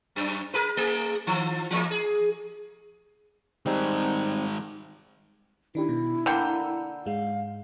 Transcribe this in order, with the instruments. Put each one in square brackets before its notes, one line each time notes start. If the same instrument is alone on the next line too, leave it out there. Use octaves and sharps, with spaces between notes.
[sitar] F#2
G#4 A#4 B4
A3 G#4
D#3 F3
E3 G#3 A#3
G#4
[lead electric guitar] D#3 G#3 [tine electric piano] G3 C4 D#4
[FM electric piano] D#3 D4 G4 [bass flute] E4
[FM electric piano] B2
[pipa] D3 A#3 G5 [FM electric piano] E6
[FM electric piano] G#2 G#3 [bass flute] F5